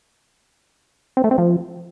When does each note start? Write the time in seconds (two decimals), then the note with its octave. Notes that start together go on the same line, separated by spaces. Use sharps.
1.17 C4
1.24 A3
1.31 C4
1.38 F3